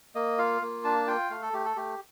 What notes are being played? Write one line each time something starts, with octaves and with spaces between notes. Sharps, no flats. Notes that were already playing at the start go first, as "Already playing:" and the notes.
A#3 D#5
F4 F5
A#3
D4 A5
F4 G5
A3 F5
A4
A3 G4
A4
A3 G4